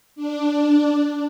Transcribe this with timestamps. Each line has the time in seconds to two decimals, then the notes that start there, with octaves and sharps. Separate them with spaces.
0.16 D4